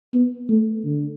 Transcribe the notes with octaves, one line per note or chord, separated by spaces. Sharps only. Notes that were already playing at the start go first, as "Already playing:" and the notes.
B3
A3
D3